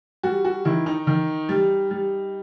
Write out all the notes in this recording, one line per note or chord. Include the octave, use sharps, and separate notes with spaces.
G3 F#4
F#4
D#3 E4
D#4
D#3
G3
G3